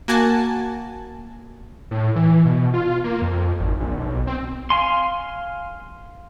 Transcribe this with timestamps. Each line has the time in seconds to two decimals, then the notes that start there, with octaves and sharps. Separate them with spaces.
0.08 A#3 F#4 G#5 A5
1.91 A2
2.16 E3
2.45 B2
2.74 F4
3.04 A#3
3.22 F2
3.60 G#1
3.80 A#1
3.97 B1
4.27 C4
4.70 F5 G#5 C6